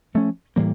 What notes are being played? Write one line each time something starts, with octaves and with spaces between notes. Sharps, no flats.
F3 A3 C#4
A2 E3 G3 A#3